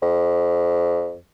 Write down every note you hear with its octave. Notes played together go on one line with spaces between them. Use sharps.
F2